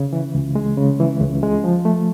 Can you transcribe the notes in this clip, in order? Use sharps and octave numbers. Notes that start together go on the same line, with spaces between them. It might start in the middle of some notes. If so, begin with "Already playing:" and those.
Already playing: C#3
E3
C#2
G#3
C#3
E3
C#2
G#3
F3
A3